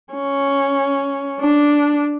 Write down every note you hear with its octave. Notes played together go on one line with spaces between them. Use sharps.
C#4
D4